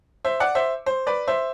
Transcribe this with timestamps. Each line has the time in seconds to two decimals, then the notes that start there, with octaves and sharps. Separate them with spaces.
0.25 C5 E5
0.40 D5 F#5
0.55 C5 E5
0.86 C5
1.07 B4 D5
1.27 C5 E5